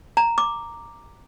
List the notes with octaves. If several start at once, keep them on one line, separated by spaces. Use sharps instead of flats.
A#5
D6